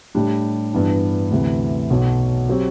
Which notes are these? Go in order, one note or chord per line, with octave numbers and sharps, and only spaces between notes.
A2 G3 D4 G4
G2 E3 B3 D4
D2 C3 E3
B1 B2 F#3
F#3 C4 G4